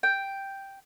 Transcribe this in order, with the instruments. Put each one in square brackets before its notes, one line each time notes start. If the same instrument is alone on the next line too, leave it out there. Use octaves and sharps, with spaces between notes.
[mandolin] G5